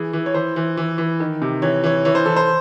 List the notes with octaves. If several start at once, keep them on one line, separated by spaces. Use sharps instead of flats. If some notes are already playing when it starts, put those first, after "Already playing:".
Already playing: E3 G#4
E3
C#5
E3 C5
E3
E3
E3
D#3
C3
E3 C#5
E3 C#5
E3 C#5
C5
E3 A4
C5